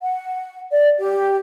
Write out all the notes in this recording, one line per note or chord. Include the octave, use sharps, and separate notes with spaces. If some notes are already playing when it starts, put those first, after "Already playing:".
F#5
D5
G4